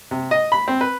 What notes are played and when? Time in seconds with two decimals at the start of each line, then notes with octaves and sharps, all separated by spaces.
0.11 C3
0.31 D#5
0.52 B5
0.68 C4
0.81 B4